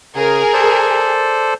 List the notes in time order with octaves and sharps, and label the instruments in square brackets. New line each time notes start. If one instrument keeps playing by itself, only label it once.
[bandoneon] C#3 [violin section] G#4 A#4
[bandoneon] A4 C5 D5